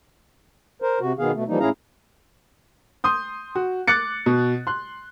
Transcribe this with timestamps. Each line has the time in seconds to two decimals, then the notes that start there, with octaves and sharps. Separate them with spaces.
0.82 A#4 C5
1.00 C3 F#4
1.19 B2 D#3 B3 G#4 F5
1.34 B2 A3
1.48 E3 F3 G3 A#3 D#4
1.60 A2 C#4 E4 G#4 F5 A#5
3.04 C6 D#6 G6
3.55 F#4
3.88 D6 F#6 A6 C#7
4.26 B2
4.67 C6 F#6